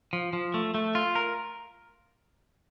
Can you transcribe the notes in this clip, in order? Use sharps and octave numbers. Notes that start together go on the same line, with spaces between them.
F3
F3
A3
A3
F4
A#4